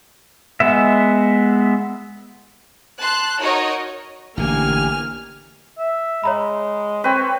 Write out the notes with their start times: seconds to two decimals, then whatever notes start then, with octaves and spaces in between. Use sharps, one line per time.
0.60 G#3 B3 E5
3.00 A5 C6 F#6
3.43 D#4 F#4 A#4 C#5 D#5 A#5
4.38 A1 B2 D3 A#3 G4 G#5 F6
5.78 E5
6.24 G#3 C#5 A#5 B5
7.04 C4 B4 C#5